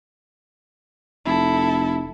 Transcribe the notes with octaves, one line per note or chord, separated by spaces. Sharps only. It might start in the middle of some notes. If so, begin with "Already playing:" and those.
F1 E4 A4